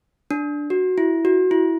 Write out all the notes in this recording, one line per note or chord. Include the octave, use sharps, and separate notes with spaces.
D4
F#4
E4
F#4
E4